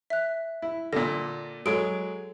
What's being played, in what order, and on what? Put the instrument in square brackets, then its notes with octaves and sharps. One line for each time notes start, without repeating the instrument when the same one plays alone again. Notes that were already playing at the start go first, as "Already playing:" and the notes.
[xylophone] E5 F#6
[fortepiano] E4
[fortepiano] A#2 D3 [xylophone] A#6
[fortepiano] F#3 G#3 [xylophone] A4 D#6 D7